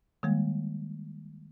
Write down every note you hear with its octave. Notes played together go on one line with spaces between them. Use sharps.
D#3 G3 G#3 A#3